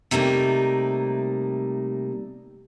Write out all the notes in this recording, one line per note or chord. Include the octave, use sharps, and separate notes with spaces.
C3 G3 A3 A#3 D#4